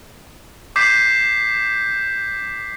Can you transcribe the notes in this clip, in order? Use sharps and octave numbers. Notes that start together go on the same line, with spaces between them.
D6 G6 B6 C7